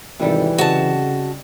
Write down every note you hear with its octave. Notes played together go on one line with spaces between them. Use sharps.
G#1 C3 E3 G3 A4
C#3 F#4 D#5 A5